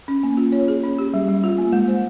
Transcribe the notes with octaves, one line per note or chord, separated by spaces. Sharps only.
C#4
A#3
F4
C#5
G#4
C#4
G4
G3
G3
F4
A#3
G#3
C5